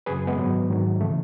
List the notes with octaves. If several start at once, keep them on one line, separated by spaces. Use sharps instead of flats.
F#2 C#3 F#3 G#4 B4
G#3 B3
G#2 D#3 F#3
G#2 D#3 F#3
C#3 E3 A3